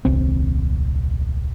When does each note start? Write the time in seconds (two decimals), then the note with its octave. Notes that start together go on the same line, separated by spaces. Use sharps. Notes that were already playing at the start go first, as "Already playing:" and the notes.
0.05 D#1 C2 C4